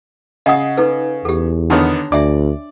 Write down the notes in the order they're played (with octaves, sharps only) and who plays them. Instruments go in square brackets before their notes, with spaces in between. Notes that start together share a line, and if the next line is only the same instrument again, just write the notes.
[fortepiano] C#3 [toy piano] D#5 F#5 D#6
[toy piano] D#4 A4 B4
[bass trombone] E2 [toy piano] G4 A4
[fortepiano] D3 D#3 B3 [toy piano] D4 C#5
[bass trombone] D2 [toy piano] D4 E5 [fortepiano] D5